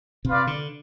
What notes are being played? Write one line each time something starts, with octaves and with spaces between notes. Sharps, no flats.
C3 F4 B4 D5 F5
D3